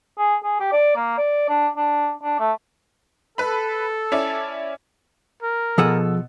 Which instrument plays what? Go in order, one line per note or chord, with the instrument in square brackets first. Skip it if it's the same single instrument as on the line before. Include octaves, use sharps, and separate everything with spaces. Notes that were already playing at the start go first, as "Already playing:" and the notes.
[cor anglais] G#4
G#4
G4
D5
A#3
D5
D4
D4
D4
A3
[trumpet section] A4 [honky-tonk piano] B4 B5
[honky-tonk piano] C#4 E4 D5
[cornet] A#4
[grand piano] B2 A4 E6 [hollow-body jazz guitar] F3 G#4 F#5